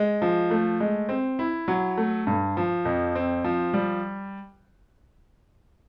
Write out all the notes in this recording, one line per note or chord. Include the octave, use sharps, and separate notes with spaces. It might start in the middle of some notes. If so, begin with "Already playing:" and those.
Already playing: G#3
F3
A3
G#3
C4
E4
F#3
A3
G2
F3
F2
C4
F3
G3